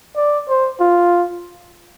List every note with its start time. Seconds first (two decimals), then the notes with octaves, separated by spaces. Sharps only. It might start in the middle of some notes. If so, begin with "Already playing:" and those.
0.16 D5
0.48 C5
0.80 F4